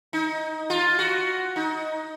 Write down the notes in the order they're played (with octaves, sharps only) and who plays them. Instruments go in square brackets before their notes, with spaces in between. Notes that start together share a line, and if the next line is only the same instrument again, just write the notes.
[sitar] D#4
F4
F#4
D#4